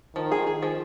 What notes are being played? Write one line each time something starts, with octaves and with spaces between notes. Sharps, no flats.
D#3 F3
G#4
G#4
F3